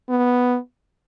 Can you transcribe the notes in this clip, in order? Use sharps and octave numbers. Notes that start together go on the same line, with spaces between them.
B3